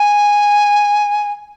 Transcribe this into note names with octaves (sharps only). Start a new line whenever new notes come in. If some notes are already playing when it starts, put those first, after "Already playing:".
Already playing: G#5